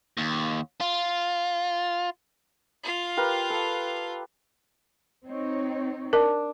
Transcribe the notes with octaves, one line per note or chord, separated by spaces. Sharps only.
D#2
F4
F4 F5
G4 A#4 B4
A4
C4 D#4 C#5
D4 A#4